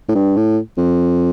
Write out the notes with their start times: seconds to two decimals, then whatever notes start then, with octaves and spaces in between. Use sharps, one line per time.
0.08 A2
0.15 G2
0.36 A2
0.78 F2